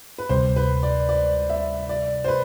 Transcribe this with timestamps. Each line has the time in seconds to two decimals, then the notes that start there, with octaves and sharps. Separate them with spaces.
0.18 B4
0.29 D2 C3 G3 C5
0.56 B4
0.83 D5
1.09 D5
1.50 E5
1.89 D5
2.24 C5
2.28 B4